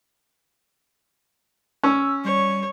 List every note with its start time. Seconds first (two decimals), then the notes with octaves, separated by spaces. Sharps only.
1.83 C#4 E6
2.25 G3 C#5